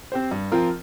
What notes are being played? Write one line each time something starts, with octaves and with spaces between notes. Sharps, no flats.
C4 G4 C5
G2
F3 C4 F4 A#4